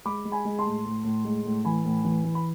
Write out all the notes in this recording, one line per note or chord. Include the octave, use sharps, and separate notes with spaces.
G#3 B5 D6
G#3
G#5 B5
G#3
A5 C6
A2
A2
A2
G#3
A2
E3 G#5 B5
A2
E3
E3
B5